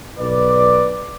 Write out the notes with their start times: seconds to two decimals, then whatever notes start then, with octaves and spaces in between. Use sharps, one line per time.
0.19 B1 B2 B4 D5